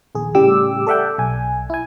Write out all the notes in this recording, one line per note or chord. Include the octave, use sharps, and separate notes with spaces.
A#1 D#2 G#4
A2 C#3 G3 G4 D6 E6
A4 D5 E5 F#5 G5
B1 G#5
E4 G#5